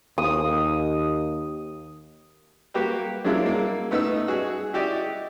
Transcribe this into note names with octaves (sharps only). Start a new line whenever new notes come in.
D#2 D#6
A#3 F#4 G4 B4
F#3 G#3 A#3 D4 E4 F4
A#3
A3 B3 D#4 E5 E6
F#4 G#4
E4 F#4 G4 D5 D#5